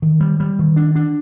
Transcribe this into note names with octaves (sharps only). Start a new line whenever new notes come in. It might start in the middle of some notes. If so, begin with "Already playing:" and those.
D#3
G3
G3
D#3
D4
D4